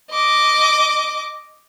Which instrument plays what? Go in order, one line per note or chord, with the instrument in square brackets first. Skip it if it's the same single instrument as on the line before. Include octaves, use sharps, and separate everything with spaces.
[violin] D#5 D6